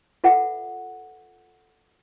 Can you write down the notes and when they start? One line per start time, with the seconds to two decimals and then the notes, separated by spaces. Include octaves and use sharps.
0.24 F4 A4 B4 E5 F#5